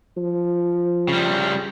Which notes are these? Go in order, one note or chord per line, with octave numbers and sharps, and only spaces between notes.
F3
C#3 G3